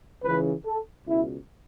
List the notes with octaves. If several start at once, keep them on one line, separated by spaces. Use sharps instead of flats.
C#2 C#3 E3 B4
A4
C#2 B2 E4